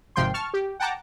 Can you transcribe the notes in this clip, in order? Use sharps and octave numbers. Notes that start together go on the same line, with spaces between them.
G#1 C3 F3 G5 C6
A5 C#6 F6
G4
F#5 G5 A5 A#5 D6